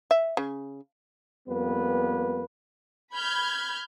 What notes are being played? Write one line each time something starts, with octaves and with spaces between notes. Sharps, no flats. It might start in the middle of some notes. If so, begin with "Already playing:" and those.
E5
C#3
F2 G3 A#3 B3 B4
B5 F6 G6 G#6